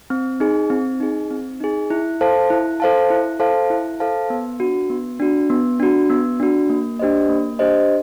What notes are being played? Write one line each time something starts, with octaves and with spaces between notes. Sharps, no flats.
C4
D#4 G#4
C4
D#4 G#4
C4
D#4 G#4
E4
A4 C5 F5 A5
E4
A4 C5 F5 A5
E4
A4 C5 F5 A5
E4
A4 C5 F5 A5
B3
D4 F#4
B3
D4 F#4
B3
D4 F#4
B3
D4 F#4
A#3
D4 G4 C5 D#5
A#3
D4 G4 C5 D#5